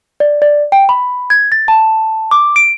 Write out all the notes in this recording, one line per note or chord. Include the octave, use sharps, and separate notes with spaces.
D5
D5
G5
B5
G#6
A6
A5
D6
D7